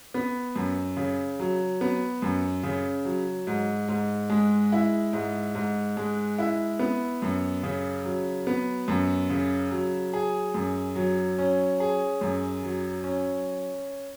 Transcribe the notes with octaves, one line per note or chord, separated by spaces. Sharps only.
B3
F#2
C#3
F#3
B3
F#2
C#3
F#3
G#2
G#2
G#3
E4
G#2
G#2
G#3
E4
B3
F#2
C#3
F#3
B3
F#2
C#3
F#3
G#4
F#2
F#3
C#4
G#4
F#2
F#3
C#4